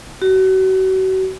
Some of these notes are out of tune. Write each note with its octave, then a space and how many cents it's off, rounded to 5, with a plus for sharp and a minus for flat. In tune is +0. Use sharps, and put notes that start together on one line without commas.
F#4 +35